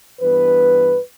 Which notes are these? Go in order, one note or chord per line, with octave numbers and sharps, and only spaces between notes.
G2 E3 B3 B4